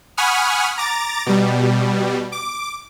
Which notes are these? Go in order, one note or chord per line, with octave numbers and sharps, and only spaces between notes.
F#5 G#5 B5 C#6 D#6 F6
A#5 D6 A6
B2 G3
D6